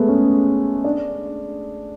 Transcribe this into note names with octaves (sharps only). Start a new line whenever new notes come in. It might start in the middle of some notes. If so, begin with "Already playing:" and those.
Already playing: G#3 A3 B3
C#4
D4